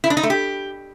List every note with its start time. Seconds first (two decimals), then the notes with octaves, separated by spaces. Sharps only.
0.04 E4
0.10 D4
0.17 D#4
0.23 A3
0.30 G4